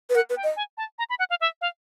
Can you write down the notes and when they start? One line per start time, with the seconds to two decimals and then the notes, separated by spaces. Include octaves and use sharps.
0.10 B4
0.15 A#4 F#5
0.30 B4
0.36 G5
0.43 D#5
0.56 G#5
0.77 A5
0.99 A#5
1.10 B5
1.19 F#5
1.30 F5
1.41 E5
1.61 F5